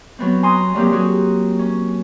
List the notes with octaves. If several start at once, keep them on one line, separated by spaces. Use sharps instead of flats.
F#3 B3 C4
G#5 A#5 C6 D#6
G2 F#3 A#3 C4 G4
F#3 F#4 G#4
C#4